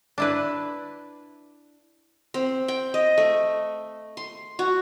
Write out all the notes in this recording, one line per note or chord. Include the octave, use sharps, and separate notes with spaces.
D4 E4 B4
C4
G5
D#5
A3
C6
F#4